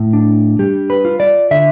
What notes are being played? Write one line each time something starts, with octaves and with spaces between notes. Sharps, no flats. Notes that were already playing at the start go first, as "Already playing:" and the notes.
Already playing: A2
D4
G3 G4
B4
F4
D5
D3 E5